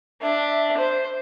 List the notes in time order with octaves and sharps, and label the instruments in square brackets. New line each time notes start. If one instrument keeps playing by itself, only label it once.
[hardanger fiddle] D4 [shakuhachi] E5
[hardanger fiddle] C5